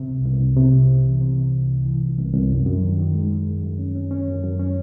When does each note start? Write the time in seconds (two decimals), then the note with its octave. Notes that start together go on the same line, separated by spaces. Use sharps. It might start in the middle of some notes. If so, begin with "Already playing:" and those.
Already playing: C3
0.08 C2
0.25 C2
0.40 C2
0.57 C3
0.73 C2
0.89 C2
1.05 E3
1.21 C3
1.37 C3
1.53 C2
1.69 C2
1.86 E3
2.02 C2
2.18 C2
2.34 C2
2.50 F#2
2.66 F#2
2.82 D#3
2.99 D#3
3.15 G#3
3.30 G#3
3.46 F#2
3.63 F#2
3.79 C#4
3.95 C#4
4.11 C#4
4.27 F#2
4.44 F#2
4.59 C#4